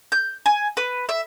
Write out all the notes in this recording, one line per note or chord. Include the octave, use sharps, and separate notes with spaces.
G6
G#5
B4
E5